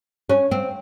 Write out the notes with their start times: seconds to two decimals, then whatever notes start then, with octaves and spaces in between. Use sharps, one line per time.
0.29 C#4
0.51 C4